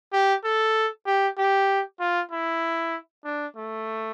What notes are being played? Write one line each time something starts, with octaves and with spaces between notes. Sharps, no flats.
G4
A4
G4
G4
F4
E4
D4
A3